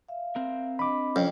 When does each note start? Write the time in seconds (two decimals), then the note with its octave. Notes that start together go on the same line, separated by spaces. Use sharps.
0.09 E5 F5
0.36 C4 A#4
0.79 D4 D#5 B5 D6
1.16 F2 C#4